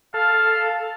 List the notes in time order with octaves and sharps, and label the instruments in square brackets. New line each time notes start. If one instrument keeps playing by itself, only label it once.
[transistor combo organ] A4 [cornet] F5